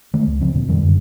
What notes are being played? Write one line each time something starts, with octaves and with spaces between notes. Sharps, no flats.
D#3 E3 G#3 A3
C#2
C#3 F3 C4
D2 A#2
F2 B2 D#3 G3
F#2 D3